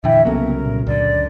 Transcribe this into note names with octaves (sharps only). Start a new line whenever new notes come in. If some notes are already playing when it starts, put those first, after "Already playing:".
F2 A#2 D3 E3 E5 G5
C2 C#3 F#3 A#3 B3 A4 A#4
A#2
C#2 F#2 D3 D5